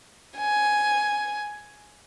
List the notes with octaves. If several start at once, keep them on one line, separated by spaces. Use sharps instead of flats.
G#5